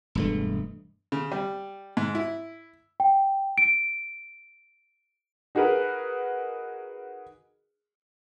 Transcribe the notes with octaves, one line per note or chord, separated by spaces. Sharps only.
E1 G2 A3
C#3
G3
G#2
E4
G5
D7
D#4 F#4 G#4 A#4 B4